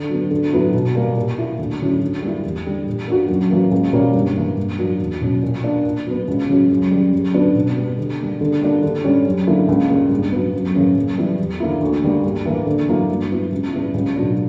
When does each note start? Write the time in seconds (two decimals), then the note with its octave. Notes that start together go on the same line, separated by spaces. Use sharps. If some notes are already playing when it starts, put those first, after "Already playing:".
Already playing: D3
0.10 F#3 B3
0.31 D3
0.53 F#3 B3 E4
0.74 B2
0.95 G3 A#3
1.16 A#2
1.37 A#3 E4
1.59 D2
1.80 D3 F#3 C#4 E4
2.02 D3
2.22 G3 A#3 E4
2.44 E2
2.66 D3 G3
2.87 A#2
3.07 A#3 D4 F#4
3.29 F#2
3.50 E3 A#3 C#4 F#4
3.71 C#2
3.93 B2 G3 A#3 C#4
4.15 G2
4.36 E3 A#3
4.57 G2
4.79 F#3 A#3 D4
5.00 E2
5.21 B2 F#3 C#4
5.42 A#2
5.64 A#3 D4
5.85 A#2
6.06 F#3 B3
6.28 C#2
6.49 C#3 F#3 C#4
6.70 F#2
6.91 C#3 G3
7.13 F#2
7.34 D3 F#3 B3 D4
7.55 B2
7.77 G3 B3
7.98 D3
8.19 G3 A#3
8.41 D3
8.61 G3 A#3 D4
8.83 D3
9.04 G3 C#4
9.25 F#2
9.47 D3 A#3 E4
9.68 C#2
9.89 C#3 G3 A#3
10.10 G2
10.32 F#3 B3
10.54 F#2
10.75 C#3 E3 A#3 C#4
10.96 F#2
11.17 E3 G3 B3 E4
11.38 E2
11.60 D3 A#3 E4
11.81 D2
12.02 D3 G3 A#3
12.24 G2
12.46 E3 A#3
12.66 D3
12.88 F#3 A#3 E4
13.09 G2
13.31 F#3 B3 E4
13.52 C#2
13.73 C#3 G3 B3 E4
13.94 C#2
14.16 B2 F#3 A#3 D4